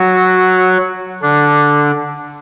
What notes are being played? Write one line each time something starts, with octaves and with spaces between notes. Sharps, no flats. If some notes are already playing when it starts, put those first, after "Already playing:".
Already playing: F#3 F#4
D3 D4